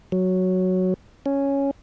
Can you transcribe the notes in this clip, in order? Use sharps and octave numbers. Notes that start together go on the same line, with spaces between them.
F#3
C#4